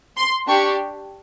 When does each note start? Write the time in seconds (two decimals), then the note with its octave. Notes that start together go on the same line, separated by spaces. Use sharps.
0.17 C6
0.48 D4 G4 C#6